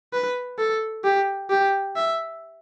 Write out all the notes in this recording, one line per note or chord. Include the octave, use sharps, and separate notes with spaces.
B4
A4
G4
G4
E5